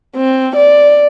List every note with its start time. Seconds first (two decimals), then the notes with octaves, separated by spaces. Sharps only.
0.16 C4
0.56 D5